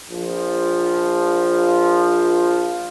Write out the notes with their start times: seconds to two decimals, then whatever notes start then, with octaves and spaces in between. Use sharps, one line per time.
0.10 A#1 F3